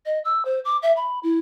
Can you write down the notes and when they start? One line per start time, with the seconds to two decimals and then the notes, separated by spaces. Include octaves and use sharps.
0.06 D#5
0.25 E6
0.45 C5
0.65 D6
0.83 E5
0.97 B5
1.23 E4